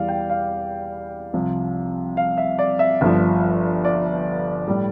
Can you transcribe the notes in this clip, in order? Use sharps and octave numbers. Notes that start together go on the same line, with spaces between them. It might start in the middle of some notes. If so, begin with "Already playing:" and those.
Already playing: E2 E3 G3 D5 F5
G5
F5
C2 C3 F3
F5
E5
D5
E5
G1 G2 F3
D5
A2 G3